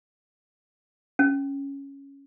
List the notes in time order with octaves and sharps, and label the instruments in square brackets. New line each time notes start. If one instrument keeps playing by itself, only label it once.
[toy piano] C#4